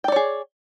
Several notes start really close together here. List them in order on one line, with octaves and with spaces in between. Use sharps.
G5 D5 C#5 G#4